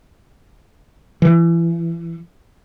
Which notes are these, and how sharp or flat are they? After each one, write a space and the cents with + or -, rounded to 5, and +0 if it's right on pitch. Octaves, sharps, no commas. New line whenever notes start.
E3 +30